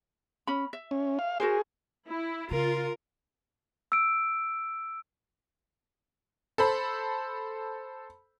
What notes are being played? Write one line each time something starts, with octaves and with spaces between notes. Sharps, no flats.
C#4 B5
E5
C#4
F5
F#4 G#4 A#4 C5
E4
C#3 F4 A#4
E6 D7
A4 C5 B5